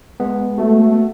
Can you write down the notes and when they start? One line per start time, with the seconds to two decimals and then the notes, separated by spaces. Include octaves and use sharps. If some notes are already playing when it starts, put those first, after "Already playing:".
0.20 G#3 B3
0.58 A3 F#4